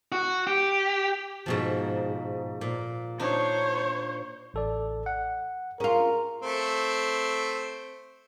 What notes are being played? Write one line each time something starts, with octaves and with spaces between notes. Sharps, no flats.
F#4
G4
G#2 B2 F3
A#2
D4 D#4 C5 C#5
A1 A4 D5
F#5
C#4 F4 G#4 A#4
A3 C4